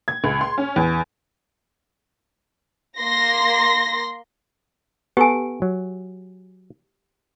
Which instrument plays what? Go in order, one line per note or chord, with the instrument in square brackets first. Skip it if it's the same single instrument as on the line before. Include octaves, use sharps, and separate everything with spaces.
[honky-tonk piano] G#6
C#2
C6
C#4
E2
[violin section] A#3 C6 A#6
[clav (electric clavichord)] B3 A4 [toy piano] G4 G#5
[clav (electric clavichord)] F#3